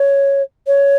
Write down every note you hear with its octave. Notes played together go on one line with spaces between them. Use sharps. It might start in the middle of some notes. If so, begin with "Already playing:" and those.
Already playing: C#5
C#5